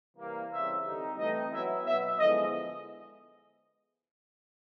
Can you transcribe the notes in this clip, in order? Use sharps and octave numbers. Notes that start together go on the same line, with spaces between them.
C3 E3 G3 A#3
C#3 E3 G3 C4 E5
D3 G3 C4 D#4
E3 A3 C4 D#4 D#5
F#3 B3 E4 E5
B2 F#3 B3 E5
D3 F3 G#3 B3 E4 D#5